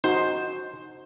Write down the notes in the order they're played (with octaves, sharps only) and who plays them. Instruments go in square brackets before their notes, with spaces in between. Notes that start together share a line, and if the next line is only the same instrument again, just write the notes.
[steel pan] D#4 F#4 [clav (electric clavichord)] C5